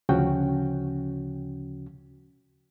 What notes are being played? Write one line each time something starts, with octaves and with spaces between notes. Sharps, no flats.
D2 C#3 F3 C#4 F#4 G5